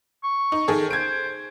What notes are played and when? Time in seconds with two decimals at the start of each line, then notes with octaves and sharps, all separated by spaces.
0.24 C#6
0.52 D#4
0.68 D#3 G#4 A4
0.91 C5 G#6 D7